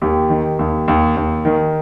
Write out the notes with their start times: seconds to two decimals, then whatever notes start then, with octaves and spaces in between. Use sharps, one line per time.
0.02 D#2 G4
0.30 D#3
0.59 D#2
0.88 D#2
1.17 D#2
1.45 D#3